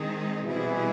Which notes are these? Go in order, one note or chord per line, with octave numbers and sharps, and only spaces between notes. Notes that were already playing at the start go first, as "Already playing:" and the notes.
Already playing: D#3 G#3 C4 D#4 G#4
B2 E3 G3 C4 E4 G#4